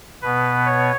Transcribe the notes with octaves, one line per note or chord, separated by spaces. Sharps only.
B2 B3 B4
C#5